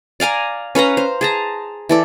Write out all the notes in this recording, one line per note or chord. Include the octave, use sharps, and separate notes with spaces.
D5 F5 G#5 A#5
C#4 B4 F5 A#5
C5
G#4 A5 A#5
E3 A4 D5